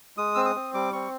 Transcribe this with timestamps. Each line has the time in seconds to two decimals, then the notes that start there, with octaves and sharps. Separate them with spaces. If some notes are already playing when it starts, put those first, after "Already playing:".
0.17 G#3 D#6
0.35 C4 E6
0.45 D#6
0.55 C4
0.74 G3 D6
0.93 C4 C#6